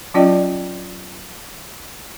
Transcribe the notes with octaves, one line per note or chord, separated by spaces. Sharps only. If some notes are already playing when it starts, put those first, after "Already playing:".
F#3 C#4 F4 D5 D#5 G5